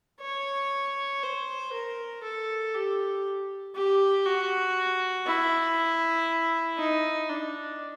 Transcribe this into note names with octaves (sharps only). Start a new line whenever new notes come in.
C#5
C5
A#4
A4
G4
G4
F#4
E4
D#4
D4